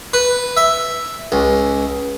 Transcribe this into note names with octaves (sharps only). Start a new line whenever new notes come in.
B4
E5
C#2